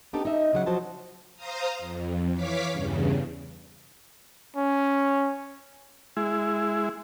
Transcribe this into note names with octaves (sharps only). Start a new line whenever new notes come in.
B3 C4 D4 D#4 G4 A4
D#4 D#5 E5
C#3 F#3 F#5
F3 F#3 F#4 C5 D#5 A5
C5 F5 A#5 D#6
F2
E3 C#5 F5 D6 B6
E2 G2 C#3
C#4
G#3 E4